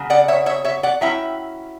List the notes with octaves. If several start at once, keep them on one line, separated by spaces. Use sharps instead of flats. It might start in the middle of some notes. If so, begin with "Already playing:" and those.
Already playing: C#3 F#3
D5 F#5
C#5 E5
C#5 E5
C#5 E5
D5 F#5
F#3 C#4 E4 E5 G5